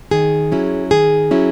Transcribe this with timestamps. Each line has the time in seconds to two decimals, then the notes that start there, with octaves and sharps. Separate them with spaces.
0.11 D#3 G#4
0.52 F#3 C#4 E4
0.91 D#3 G#4
1.31 F#3 C#4 E4